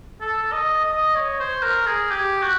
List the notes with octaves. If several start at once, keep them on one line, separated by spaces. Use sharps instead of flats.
A4
D#5
D#5
C#5
C5
A#4
G#4
G4
F#4